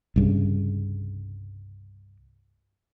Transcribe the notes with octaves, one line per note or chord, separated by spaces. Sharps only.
C2 G2 C#3